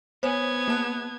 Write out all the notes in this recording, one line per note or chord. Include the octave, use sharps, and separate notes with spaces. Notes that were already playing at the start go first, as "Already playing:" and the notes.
B3 C5 C#5 G#5 G#6
A#3 A5 F#6